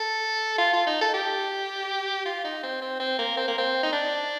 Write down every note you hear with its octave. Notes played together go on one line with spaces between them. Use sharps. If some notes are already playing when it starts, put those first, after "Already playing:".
Already playing: A4
F4
F4
D#4
A4
G4
F4
D#4
C4
C4
C4
A#3
C4
A#3
C4
D#4
D4